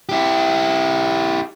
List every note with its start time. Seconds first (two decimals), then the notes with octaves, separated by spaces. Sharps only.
0.09 E4 G4